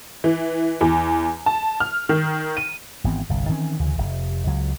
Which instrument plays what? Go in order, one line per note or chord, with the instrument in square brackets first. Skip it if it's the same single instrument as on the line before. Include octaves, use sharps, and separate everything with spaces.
[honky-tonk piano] E3
E2
A5
F6
D#3
D#7
[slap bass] G#1 E3 B3 C4
G1 C2
D#3 E3 C4 C#4
D2 C#3 E3
F1
C#2 F#3